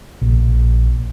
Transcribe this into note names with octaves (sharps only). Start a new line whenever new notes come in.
A#1